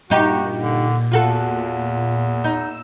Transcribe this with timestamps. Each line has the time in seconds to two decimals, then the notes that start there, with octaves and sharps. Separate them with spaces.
0.10 G2 A#2 D#4 F#4 G4
0.62 D3
1.12 E2 F4 F#4 A4
2.44 D#4 E6